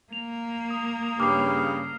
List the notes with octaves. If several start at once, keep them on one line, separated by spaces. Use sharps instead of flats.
A#3 F7
D#6
G2 C#3 D6 F6 C7